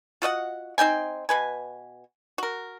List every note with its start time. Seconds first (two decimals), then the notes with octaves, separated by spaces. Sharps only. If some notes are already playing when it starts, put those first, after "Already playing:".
0.22 F4 F#4 D#5 F#5
0.78 C4 D#4 G5 G#5
1.29 B2 B4 G#5
2.38 F#4 A#4